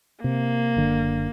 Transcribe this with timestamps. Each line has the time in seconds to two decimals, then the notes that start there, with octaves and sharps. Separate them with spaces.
0.24 C3 A#3
0.76 F#1 D3